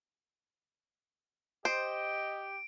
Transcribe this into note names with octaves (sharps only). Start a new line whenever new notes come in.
G4 C5 D#5 D7